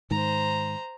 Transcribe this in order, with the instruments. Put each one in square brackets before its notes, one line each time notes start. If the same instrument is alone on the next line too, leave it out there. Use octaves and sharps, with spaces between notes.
[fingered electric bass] G#2 D#3 [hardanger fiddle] C5 A#5